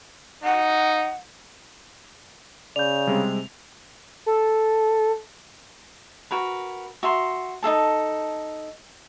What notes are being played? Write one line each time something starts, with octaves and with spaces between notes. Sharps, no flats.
D#4 F#5
C#3 D5 G6 F7
C3 G3 G#3 C4
A4
F#4 A#4 B4
F#4 E5 A#5 C6
D#4 F4 A4 A5